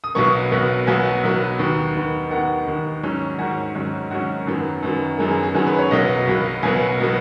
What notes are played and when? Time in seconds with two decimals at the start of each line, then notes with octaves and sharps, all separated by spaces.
0.04 D#6
0.15 B1 B2 F#3 B3 C#6
0.52 B1 B2 F#3 B3
0.87 B1 B2 F#3 B3 G#5
1.23 B1 B2 F#3 B3
1.59 D#2 D#3 B3
1.95 D#2 D#3 B3
2.31 D#2 D#3 B3 F#5
2.67 D#2 D#3 B3
3.03 G#2 D#3 F#3 C#4
3.39 G#2 D#3 F#3 C#4 F#4
3.75 G#2 D#3 F#3 C#4
4.11 G#2 D#3 F#3 C#4 F#4
4.47 F#2 D#3 F#3 B3
4.83 F#2 D#3 F#3 B3
5.19 F#2 D#3 F#3 B3 G#4
5.31 G#4
5.43 G#4
5.55 F#2 D#3 F#3 B3 G#4
5.67 B4
5.79 C#5
5.91 B1 B2 F#3 B3 D#5
6.27 B1 B2 F#3 B3
6.63 B1 B2 F#3 B3 G#5
7.00 B2 F#3 B3